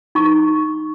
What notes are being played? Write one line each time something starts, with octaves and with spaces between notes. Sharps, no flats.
D#4 C#6